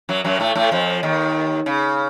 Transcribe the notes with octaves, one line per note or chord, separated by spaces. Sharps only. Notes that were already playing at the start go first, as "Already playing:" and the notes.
F#2 F#3
F#2 F#3
A2 A3
A2 A3
F2 F3
D#2 D#3
C#3